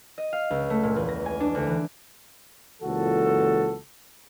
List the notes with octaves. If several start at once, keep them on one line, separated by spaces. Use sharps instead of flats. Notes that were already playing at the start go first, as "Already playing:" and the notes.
D#5
F5
C#2
A3
A#2
E2
A#6
G#5
D4
D2
E3
C#2 A#2 E3 F#4 A4